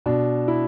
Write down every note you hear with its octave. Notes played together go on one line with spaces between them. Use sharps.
B2 D4
E4